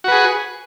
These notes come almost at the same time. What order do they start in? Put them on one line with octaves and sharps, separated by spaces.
F#4 B4 G#4